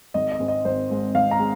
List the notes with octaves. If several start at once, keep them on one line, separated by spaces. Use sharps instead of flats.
G#1 D#5
D#5
G#2 G#3 C4
D#5
G#1 C5
G#2 G#3 C4
G#1 F5
A#5
G#3